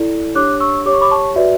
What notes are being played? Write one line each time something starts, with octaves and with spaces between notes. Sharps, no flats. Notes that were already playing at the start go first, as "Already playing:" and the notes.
Already playing: E4 A4 D5
D4 G4 C#5 D6 F#6
C#6 E6
G4 C#5 D6
C#6
B5 D6
A5 C#6
F#4 B4 D5 E5